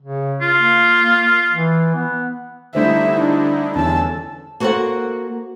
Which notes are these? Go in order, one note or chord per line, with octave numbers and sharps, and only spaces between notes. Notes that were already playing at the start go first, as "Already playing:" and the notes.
C#3
F4
A#3
E3
B3
D3 G3 A3 D#4 E4 C5 E5
D4
E2 D3 C#4 A5 E6
A#3 F#4 A4 B4 C5 F#5